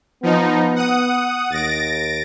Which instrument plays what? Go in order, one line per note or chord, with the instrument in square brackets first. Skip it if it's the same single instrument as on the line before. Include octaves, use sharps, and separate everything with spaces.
[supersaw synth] F3 D#4 [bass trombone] B3
[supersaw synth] F#5 D#6
[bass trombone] D#2 [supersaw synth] A6 A#6 D7